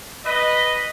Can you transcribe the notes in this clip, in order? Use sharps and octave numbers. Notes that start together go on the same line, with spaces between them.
B4 D#5